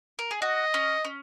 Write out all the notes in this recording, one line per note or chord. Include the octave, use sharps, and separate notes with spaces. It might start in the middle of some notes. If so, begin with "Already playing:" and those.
A#4
G#4
F#4 D#5
C#4
C#4